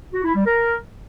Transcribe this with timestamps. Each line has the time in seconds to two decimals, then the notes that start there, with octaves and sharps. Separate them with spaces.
0.13 F#4
0.24 E4
0.35 G3
0.46 A#4